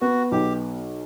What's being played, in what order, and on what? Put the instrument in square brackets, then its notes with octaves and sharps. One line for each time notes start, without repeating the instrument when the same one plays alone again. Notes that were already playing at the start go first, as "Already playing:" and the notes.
[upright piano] B3 [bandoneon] F#4
[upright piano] B1 [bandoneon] G4